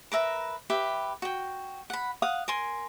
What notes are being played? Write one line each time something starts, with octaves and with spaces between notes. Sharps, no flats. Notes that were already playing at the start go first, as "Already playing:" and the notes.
A#4 B4 E5 A#5
G4 B4 E5
F#4 G5
F#5 B5
F5 F#5 D#6
A#4 G#5 C6